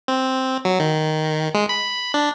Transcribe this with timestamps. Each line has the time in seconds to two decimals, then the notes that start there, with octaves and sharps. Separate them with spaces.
0.08 C4
0.65 F#3
0.80 D#3
1.54 G#3
1.69 B5
2.14 D4